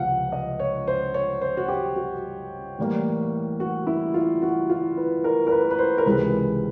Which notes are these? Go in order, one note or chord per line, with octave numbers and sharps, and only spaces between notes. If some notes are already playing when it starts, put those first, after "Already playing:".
Already playing: C#2 C3 F3 F5 F#5
D#5
C#5
C5
C#5
C5
F#4
G4
F#4
A2 E3 G3 A#3
F#4
E4
F4
F#4
F4
B4
A#4
A#4
B4
A#4
B4
C5
A#4
C#2 C3 E3 G#3 B4